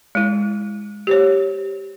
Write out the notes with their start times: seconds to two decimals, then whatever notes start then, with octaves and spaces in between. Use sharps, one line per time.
0.15 G#3 E4
1.07 G4 C5 C#5